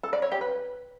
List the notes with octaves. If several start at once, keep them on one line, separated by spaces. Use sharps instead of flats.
A4
D5
C#5
G4
B4